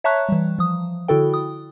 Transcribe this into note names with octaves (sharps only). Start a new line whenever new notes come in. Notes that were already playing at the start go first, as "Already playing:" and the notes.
C#5 E5 A5 A#5 C#6 F#6
E3 G3
F3 D#6
D3 E4 F#4 A4 G5
D#6